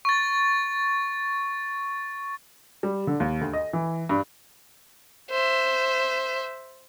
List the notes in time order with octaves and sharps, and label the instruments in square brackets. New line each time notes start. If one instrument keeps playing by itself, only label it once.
[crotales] C#6 A6
[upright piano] G3
D3
D#2
D2
D#5
E3
G2
[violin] C5 E5